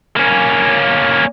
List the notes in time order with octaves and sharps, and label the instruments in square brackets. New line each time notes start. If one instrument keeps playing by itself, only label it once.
[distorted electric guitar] A#3 C#4